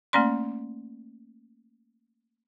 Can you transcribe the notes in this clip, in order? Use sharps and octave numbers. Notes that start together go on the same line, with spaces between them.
A3 A#3 C#4 D5 C6